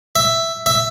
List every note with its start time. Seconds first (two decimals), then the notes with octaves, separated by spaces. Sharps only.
0.16 E5
0.66 E5